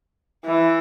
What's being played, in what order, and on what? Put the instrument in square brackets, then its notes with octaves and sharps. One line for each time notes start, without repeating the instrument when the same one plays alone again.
[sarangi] E3